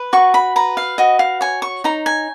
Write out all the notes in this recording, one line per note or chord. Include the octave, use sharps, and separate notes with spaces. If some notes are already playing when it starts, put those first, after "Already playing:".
Already playing: B4
F#4 C#6
B5
B4 A#5
F5
F#4 D#5
F5
C#5 G#5
C#6
D#4 A#5
G#5